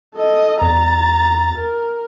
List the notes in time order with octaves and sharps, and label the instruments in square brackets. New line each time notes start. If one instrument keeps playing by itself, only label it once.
[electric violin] A4 D#5
[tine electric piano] E2 [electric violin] A#5 A6
[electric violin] A#4